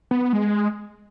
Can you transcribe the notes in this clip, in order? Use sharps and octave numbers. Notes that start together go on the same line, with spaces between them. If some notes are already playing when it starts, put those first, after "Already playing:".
B3
B3
G#3